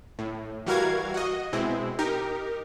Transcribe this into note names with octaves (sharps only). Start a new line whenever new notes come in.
A2
E3 G3 F#4 A#4 F5 G#6
F#4 D#5
B2 G#3 C4 E4
D#4 G4 A#4